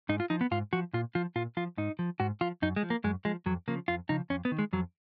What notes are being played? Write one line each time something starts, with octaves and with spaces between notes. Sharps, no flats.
G#2 D#4
F4
F3 D#4
B3
G#2 F4
F3 F#4
A#2 F4
F3 F4
A#2 F4
F3 F4
G#2 D#4
F3
G#2 F#4
F3 F4
F#2 D#4
G#3
F3
A#3
F#2 G#3
F3 G#3
F2 F#3
C#3 F3 A#3
F2 F4
C#3 F3 D#4
F2 C#4
B3
D#3
G#3
F2 F#3